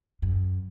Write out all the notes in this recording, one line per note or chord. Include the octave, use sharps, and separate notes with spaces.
F#2